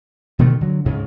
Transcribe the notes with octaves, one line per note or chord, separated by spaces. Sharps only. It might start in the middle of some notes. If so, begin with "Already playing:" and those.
B2 D3 D#3 A3
D3 F#3
D2 G#2 C#3